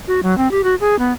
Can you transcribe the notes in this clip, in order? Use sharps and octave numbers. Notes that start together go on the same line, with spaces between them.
F#4
F#3
C4
G4
F#4
G#4
B3